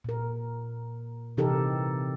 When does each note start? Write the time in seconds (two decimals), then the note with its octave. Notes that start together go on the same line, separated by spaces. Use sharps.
0.04 A#2 A#4
1.37 C3 E3 D#4 G4 A4 A#4